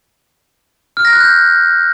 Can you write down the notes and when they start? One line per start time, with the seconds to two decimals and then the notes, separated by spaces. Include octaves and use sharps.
0.97 F6
1.05 A#6
1.13 F#6
1.21 G6